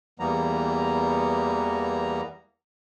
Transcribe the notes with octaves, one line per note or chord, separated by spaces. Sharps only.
E2 E3 G3 A#3 B3 A#5